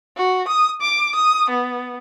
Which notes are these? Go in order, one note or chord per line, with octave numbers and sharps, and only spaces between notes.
F#4
D#6
D6
D#6
B3